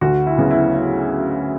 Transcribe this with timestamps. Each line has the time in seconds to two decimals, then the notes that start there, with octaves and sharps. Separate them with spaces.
0.01 D2 F#4
0.27 E4
0.38 C#3 F#3 B3
0.51 E4